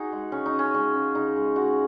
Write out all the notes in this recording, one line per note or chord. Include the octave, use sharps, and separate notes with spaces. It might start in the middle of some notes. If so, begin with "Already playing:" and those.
Already playing: D#4 F#4 G#4
G#3
C#3 C#4
D#4
C#3
C#4
G#3 C#4
C#3
C#3 D#4
G#3
G#3 F#4